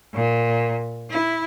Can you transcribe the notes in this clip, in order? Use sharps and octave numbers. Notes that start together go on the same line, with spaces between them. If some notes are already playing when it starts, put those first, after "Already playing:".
A#2
E4